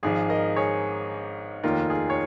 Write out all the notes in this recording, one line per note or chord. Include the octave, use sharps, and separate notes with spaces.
G#1 G#2 F3 G#4
A#4 D#5
G#4 C#5
F1 D#2 D#3 F4 A#4
G#4
C#5